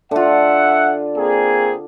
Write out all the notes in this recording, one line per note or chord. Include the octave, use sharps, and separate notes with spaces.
D3 F4 E5 F#5
A#3 C4 G#4